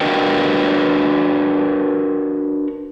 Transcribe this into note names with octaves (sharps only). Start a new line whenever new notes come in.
D4 F#4 A#4 B4 D#5 G5